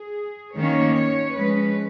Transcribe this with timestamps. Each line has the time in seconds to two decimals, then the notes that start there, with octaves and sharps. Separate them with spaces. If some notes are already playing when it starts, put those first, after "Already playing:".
Already playing: G#4
0.56 D#3 A#3 C#4 C#5
0.96 C#5
1.36 F3 G#3 C#4 B4